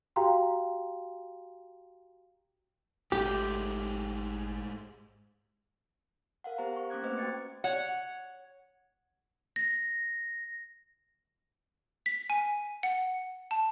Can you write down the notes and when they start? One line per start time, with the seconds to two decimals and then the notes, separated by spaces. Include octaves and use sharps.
0.16 F#4 G4 F5 G5 A#5 C6
3.12 G#1 G#2 G#3 A3 G4
6.44 A#4 F5 F#5
6.58 B3 G4 C5 A#5
6.76 C#6
6.90 A#3 C#4 D6 F#6 G#6
7.03 A3 A#3 C4 B4 C5 D#5
7.18 F#4 C5 G5 G#6 A6 C#7
7.64 C#5 F#5
9.56 A#6
12.06 B6
12.30 G#5
12.83 F#5
13.51 A5